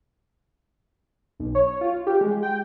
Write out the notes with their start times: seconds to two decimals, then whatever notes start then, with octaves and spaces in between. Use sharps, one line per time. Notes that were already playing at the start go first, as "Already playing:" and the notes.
1.40 B1
1.55 C#5
1.81 F4
2.07 G4
2.21 G#3
2.43 G5